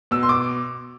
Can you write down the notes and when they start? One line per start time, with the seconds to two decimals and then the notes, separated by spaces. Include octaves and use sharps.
0.11 B2 E6
0.23 C6
0.29 D6